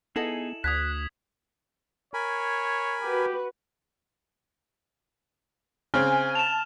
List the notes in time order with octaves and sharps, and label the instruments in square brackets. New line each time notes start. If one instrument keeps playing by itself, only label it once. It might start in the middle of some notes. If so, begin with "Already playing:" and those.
[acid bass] B3 [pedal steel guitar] D#4 G#4 [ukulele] E4 A4 D#5 [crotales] E7 F#7
[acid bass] D2 [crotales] D#6 G#6 B6 [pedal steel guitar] F#6
[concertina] A#4 G#5 B5 [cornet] C#5
[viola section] F#4 B4 [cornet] G4
[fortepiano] C#3 C4 [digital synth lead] G#5 [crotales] F6
[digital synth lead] A5 [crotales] E7 F7